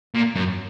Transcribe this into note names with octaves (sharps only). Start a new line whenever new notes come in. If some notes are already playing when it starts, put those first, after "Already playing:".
A#2
F#2